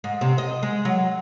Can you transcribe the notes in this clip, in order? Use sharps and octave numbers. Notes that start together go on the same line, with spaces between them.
G#2
C3
D#5
G#3
F#3